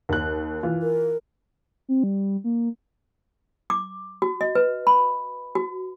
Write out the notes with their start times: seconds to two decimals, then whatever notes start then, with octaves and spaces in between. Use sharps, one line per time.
0.09 D#2 F#6
0.63 E3 F4
0.82 A#4
1.89 C4
2.03 G3
2.44 A#3
3.70 D6
4.22 F#4
4.41 D#5
4.55 B4
4.87 B5
5.55 F#4